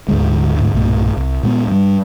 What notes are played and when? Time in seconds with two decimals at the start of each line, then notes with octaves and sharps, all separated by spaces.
0.08 D2 G#2 D3 G#3
0.55 D2 G#2
0.74 B1 G2 A#2 A3
1.17 C2
1.43 A#2 G#3 B3
1.67 G2 G3